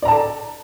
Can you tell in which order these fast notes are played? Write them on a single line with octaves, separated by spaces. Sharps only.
D5 A#5 A5 A4